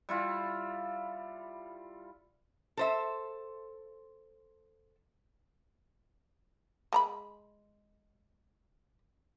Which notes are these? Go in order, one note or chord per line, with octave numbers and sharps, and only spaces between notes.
G3 E4 F4
A4 C5 E5
G#3 A#5 B5